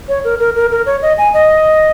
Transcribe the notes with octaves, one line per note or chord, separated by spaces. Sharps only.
C#5
A#4
A#4
A#4
A#4
C#5
D#5
G#5
D#5